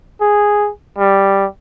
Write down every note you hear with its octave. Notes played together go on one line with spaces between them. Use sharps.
G#4
G3